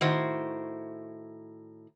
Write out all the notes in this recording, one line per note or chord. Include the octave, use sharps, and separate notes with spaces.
A2 D#3 E4 F#4 C5